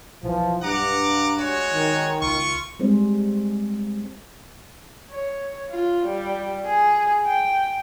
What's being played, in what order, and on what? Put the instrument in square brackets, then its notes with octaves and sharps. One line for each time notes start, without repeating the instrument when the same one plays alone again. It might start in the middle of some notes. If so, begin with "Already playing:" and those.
[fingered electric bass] B1 [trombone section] E3 F3
[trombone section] G2 [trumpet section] F#5 A#5 D6
[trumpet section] G#3 F#4 C#5
[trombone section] D#3
[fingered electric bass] C#2 [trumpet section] F4 C#6
[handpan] G3 G#3 C4 G#4 C5
[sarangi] C#5
F4
G3
G#4
G5